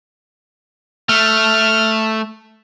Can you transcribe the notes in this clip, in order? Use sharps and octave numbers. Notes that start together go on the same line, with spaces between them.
A3 F6